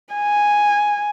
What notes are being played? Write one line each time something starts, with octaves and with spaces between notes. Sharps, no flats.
G#5